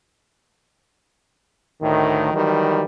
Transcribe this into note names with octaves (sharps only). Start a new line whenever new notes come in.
D2 A2 D#3
D#3 E3 F#3 G3